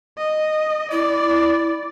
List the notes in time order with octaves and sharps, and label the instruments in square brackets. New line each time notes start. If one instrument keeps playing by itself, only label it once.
[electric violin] D#5
[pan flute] E4 [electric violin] D5